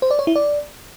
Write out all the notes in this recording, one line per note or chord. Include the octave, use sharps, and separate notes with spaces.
C5
D5
C#5
E4
D5